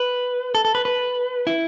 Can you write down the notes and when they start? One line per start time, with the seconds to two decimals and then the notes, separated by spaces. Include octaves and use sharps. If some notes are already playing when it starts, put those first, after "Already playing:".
Already playing: B4
0.55 A4
0.65 A4
0.75 B4
0.85 B4
1.47 E4